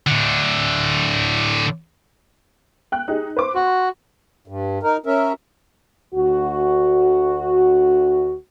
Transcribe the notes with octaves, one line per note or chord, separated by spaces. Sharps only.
A2 D3
G5 F#6
D#4 G4 G#4
B4 C5 D6
F#4 C6
G2
D#4 A#4
C#4 A#4 E5
D2 F#4